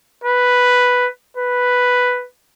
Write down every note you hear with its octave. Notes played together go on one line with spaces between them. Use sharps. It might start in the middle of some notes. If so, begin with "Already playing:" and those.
B4
B4